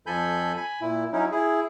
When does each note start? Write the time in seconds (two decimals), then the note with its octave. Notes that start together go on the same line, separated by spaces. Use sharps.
0.07 F2 F3 A4 G#5 B5 G6
0.57 G#5 B5
0.81 A#2 E4
1.13 F#3 C#4 D#4 E4
1.32 E4 G#4